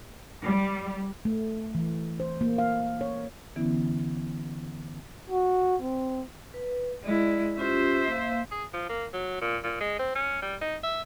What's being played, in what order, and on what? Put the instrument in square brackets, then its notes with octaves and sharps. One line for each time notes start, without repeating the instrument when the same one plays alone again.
[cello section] G3
[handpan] A3
E3
C5
A#3
F5
C#5
[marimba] D3 E3 B3 C#4 E4
[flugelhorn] F#4
C4
[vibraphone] B4
[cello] G#3 E4 [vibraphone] D5
[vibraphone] C#4 F4 G4 [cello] C5 E5
[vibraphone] A#3 F5
[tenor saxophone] G#4
F3
A#3
F#3
A#2
A#2
G#3
C4
C#4
G3
D#4
E5